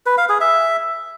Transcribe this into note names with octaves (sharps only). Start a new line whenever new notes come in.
B4
F5
G#4
E5